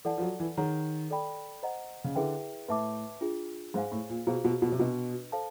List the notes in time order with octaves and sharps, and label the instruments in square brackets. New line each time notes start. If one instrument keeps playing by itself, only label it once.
[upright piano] E3 [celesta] A4 D5 F#5 A5
[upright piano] F3
F#3
E3
[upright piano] D#3 [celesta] G#4 C#5 F#5 A#5
[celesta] A4 D5 G5 B5
C5 D#5 F#5 A#5
[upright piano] C#3
[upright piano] D3 [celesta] E4 G#4 B4 E5 G5
[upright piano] A2 [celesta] B4 E5 A5 D6
[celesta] D4 F4 G#4
[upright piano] G#2 [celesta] G#4 C5 F5 G#5
[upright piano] A2
A#2
[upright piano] B2 [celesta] F4 G#4 C5 F5 A#5
[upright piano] B2
B2
C3
[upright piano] B2 [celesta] D4 F#4 B4 D#5
[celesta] A4 C5 F5 A5